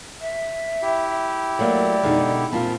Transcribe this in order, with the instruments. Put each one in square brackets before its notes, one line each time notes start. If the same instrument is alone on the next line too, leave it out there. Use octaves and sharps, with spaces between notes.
[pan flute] E5
[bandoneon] E4 G4
[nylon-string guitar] F#3 A3 A#3 [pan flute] D5
[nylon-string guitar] B2 D3 G#3 [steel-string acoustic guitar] D#4 A#4
[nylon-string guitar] A#2 [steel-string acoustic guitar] C4 F4 A#4 [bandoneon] A5 B5